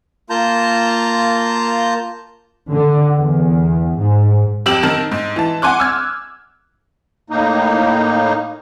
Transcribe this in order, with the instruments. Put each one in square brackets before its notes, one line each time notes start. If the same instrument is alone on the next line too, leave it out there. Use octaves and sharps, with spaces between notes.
[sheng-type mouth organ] A#3 F4 A5 A#5 G6
[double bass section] D3
E2
G#2
[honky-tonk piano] F2 G4 E6 E7 F#7
D#3 A#4 A5 E7
G#2
E3 A5
F#5 G#5 C6 D6 F#6
E6 F6 G#6
[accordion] A2 A#3 D#4